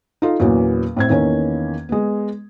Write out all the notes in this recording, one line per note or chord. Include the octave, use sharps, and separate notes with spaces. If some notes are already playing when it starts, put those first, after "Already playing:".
D#4 F4 A4
E2 A#2 F#3 B3 C#4
A2 C4 G#6
E2 D#3 A#3 C#4
G#3 B3